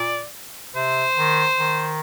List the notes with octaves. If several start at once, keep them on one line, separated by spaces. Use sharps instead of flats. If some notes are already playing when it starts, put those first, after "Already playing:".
Already playing: A#2 D5
C3 C5
D#3
D#3